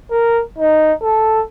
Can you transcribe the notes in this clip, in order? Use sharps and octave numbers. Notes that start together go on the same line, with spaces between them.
A#4
D#4
A4